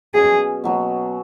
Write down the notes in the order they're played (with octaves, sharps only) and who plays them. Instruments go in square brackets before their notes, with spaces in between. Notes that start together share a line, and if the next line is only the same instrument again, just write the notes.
[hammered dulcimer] B2 F#3 C#4 [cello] G#4
[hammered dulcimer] B2 F#3 B3